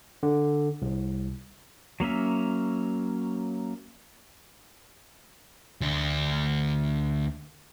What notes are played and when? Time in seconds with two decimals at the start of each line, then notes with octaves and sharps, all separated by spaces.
0.23 D3
0.82 C2
2.00 F#3 A#3 C#4 E5
5.81 D2 D4